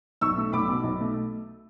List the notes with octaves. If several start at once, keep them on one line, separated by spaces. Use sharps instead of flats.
B1 C#6 E6
A3
B1 B5 D6
B2
B1
A3